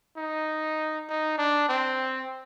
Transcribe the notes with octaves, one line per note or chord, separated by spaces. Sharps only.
D#4
D#4
D4
C4